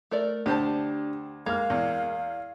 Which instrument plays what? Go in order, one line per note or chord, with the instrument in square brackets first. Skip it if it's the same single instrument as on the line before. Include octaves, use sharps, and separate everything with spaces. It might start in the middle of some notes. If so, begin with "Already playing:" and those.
[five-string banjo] A3 A#4 D5
[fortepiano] D2 C5 A5 [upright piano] D4 [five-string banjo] G4
[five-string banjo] G#3 A#3 A#5 [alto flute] F5 [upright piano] F6 G#6
[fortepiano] E2